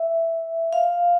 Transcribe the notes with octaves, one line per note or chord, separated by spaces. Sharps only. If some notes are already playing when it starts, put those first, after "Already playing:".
Already playing: E5
F5